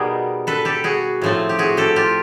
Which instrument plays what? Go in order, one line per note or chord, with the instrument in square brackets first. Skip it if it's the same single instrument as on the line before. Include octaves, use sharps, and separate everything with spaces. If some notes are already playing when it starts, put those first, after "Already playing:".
Already playing: [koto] B2 G3 B3 D#4 G#4 A#4
A4 B4
G4 A4
F#4 G#4
A2 F3 A3 C4
G4
F#4 G#4
G4 A4
F4 G4